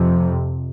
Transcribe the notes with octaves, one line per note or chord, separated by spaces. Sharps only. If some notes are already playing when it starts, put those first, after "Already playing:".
Already playing: F2 C3